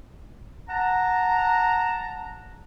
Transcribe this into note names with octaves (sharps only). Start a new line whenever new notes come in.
F#5 A5 A#5